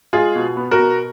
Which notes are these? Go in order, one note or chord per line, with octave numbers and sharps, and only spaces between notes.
G#3 F4 G#4
B2
B3
F#4 A#4
B2